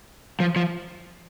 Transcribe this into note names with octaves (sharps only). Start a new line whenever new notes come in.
F3
F3